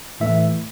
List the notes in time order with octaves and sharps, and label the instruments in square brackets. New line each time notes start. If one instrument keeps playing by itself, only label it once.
[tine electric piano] A2 E3 A3 E5